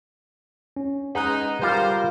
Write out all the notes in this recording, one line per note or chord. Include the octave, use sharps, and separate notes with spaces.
C#4
G#3 D#4 G#4 B4 F#5 A#5 F#6
G3 F4 A#4 C5